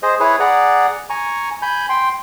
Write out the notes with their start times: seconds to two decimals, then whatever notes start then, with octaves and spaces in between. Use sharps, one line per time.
0.03 G#4 C5 D#5
0.20 E4 G#4 B4 C#5
0.40 G#4 D5 F#5 A#5
1.10 G#5 A#5 C#6
1.62 G#5 B5 G6
1.89 G5 C6